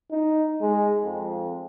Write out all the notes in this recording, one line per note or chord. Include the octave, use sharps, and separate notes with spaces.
D#4
G#3
F2